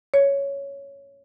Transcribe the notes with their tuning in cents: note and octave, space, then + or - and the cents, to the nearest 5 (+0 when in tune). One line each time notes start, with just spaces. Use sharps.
C#5 +5